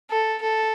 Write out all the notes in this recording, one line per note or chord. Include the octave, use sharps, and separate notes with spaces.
A4
A4